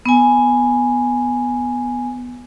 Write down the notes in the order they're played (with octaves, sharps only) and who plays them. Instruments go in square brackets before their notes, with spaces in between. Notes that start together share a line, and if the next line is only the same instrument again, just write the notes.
[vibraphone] B3 G#5